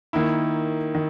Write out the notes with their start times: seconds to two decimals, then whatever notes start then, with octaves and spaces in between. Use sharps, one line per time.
0.13 D#3 A#3 E4
0.95 D#3